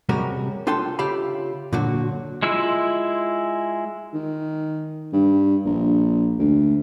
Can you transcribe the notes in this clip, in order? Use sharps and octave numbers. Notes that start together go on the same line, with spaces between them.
C3 G3 G#3 C#4 F#4 A#4
D4 F4 A4 G5 A5 C6
C#3 F4 G4 E5 F5 B5
A#2 D3 F#3 F#4
G#3 E4 F4 E6
D#3
G2
A#1
D2